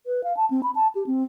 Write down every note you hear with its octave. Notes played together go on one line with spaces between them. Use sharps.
B4
F5
A5
C4
B5
A5
G4
C4